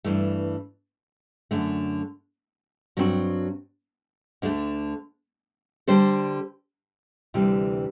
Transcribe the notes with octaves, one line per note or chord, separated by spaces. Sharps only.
G2 E3 A3
F#2 D3 A3
G2 F#3 C4 F#4
D2 D3 A3
D3 G3 D4 A4 C5
D2 C3 E3 G3